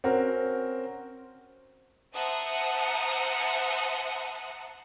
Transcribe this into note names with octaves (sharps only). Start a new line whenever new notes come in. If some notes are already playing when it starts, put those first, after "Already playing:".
C4 C#4 F#4 A#4
C5 E5 F#5 A5 A#5 D#6